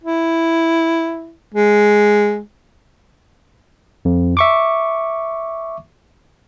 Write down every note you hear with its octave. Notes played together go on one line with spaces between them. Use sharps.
E4
G#3
F2
E5 C#6 D6